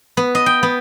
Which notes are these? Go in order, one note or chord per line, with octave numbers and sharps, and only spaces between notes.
B3
D#5
G5
B3